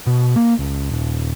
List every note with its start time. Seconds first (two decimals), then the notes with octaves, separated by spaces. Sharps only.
0.07 B2
0.36 A#3
0.59 C#2
0.91 D#1